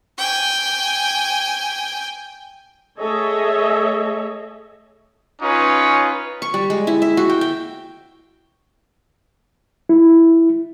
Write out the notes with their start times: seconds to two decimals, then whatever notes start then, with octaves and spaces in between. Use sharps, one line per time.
0.18 G5 G#5
2.99 A3 G#4 A4 C#5 D#5 E5
5.41 C#4 D#4 F4 B4 C#5
6.42 C#6
6.54 G3
6.70 G#3
6.87 E4
7.02 E5
7.17 F#4
7.29 G5
7.41 G5
9.89 E4